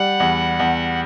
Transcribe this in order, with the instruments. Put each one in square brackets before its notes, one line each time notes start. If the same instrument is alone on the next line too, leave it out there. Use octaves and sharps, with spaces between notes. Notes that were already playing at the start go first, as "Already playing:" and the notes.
Already playing: [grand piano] G3 [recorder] F#5
[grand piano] E2
E2